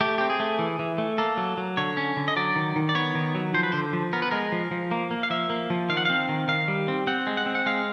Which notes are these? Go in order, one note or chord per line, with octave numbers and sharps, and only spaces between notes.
A3 G4
C4 G4
G#4
A3
E3
E3
A3
A#3 A4
F#3
F#3
D3 C#5
C#4
D3
D#5
F#3 D5
D#3
D#3
D5
B3 C#5
D#3
F#3
F3 C5
B4
D3 C5
F3
B3 A#4
B4
G#3 A#4
F3
F3
A#3
A#3
F5
F3 E5
A#3
F3
D#3 F5
F#5
C4 F5
D#3
D#3 F5
G3
C4
C4 F#5
G#3
F#5
C4
F#5
G#3 F5